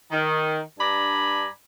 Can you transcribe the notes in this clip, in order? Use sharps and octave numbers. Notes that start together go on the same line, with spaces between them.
D#3
G2 D4 D5 G#5 A#5 B5